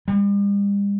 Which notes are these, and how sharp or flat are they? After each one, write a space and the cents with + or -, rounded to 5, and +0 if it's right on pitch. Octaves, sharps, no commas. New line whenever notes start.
G3 +45